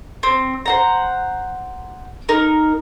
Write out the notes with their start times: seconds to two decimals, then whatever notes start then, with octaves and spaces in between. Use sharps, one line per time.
0.23 C4
0.66 C5 F#5 A#5
2.29 D#4 A#4